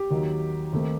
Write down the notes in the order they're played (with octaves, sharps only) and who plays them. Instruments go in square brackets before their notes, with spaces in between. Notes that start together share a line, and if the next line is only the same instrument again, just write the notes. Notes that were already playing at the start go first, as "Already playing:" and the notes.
Already playing: [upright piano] G4
D#2 D#3 F#3
D#2 D#3 A3 C4